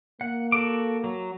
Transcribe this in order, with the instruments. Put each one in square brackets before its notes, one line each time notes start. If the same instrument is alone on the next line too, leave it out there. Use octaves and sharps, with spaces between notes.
[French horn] A#3 [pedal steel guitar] F#5
[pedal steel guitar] F#4 A4 D6
F#3